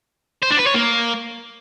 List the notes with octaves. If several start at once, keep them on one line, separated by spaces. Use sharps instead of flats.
C5
D4
B4
C#5
A#3